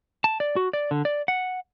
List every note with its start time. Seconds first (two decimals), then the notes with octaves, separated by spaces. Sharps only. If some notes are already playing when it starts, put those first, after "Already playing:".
0.24 A5
0.40 D5
0.56 F#4
0.73 D5
0.91 D3
1.05 D5
1.28 F#5